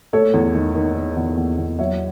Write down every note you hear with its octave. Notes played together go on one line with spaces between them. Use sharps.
A3 A4 C#5
E2
D#3
D#3
D#3
E2
E2
E2
F#3 C#5 E5